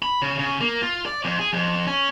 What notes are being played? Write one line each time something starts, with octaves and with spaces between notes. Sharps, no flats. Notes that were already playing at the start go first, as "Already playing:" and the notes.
B5
C#3
C#3
A#3
F4
D5
F2
G#4
F2
C#4